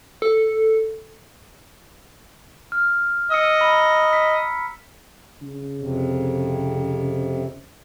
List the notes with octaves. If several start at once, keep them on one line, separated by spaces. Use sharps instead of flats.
A4
F6
D#5 E6 C#7
A#5 B5
B6
C#3
F2 C3